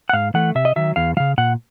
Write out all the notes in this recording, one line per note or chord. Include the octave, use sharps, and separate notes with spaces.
F#5
G#2 F5
E3 A3 F#5
C3 E5
D#5
D#3 F#3 E5
E2 F5
C#3 F3 F5
A#2 F#5